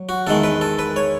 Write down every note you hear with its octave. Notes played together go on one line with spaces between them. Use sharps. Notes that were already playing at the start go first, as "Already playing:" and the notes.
Already playing: F#3
F#4
E2 D#3 G#3 A4
B4
A4
B4
C#5